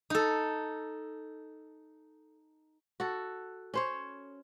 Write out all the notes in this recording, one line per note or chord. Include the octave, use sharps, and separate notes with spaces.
D#4 A4
F#4 A4
C#4 C5 C#5